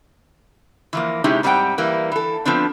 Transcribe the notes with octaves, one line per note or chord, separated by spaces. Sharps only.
E3 F3 A#3
C3 G#3 C#4 D#4 E4 G4
G#2 G3 C4 G4 F#5 G5
E3 G3 A#3
E3 A4
F3 B3 C4 D4